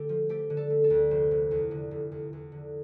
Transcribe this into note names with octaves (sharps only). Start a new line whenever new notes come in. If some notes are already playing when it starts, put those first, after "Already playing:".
Already playing: D3 A3 G4 A4
F3
A3 G4
D3
A4
A3
A4
D2
F1 C5
F1
E2
D3
F1
E2
E2
D3